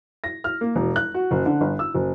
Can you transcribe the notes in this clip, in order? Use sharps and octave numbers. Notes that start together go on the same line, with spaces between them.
A#6
F6
A#3
E1
F#6
F#4
F#1
D3
G1
E6
F#1